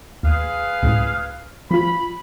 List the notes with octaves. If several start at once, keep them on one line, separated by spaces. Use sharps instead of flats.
D#2 G#4 B4 F5
C#2 A2
F3 F4 B5